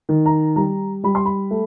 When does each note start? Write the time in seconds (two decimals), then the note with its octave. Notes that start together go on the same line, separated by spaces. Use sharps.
0.09 D#3
0.26 A#5
0.56 G3 A#5
1.04 G3 B5
1.15 C6
1.26 B5
1.51 A3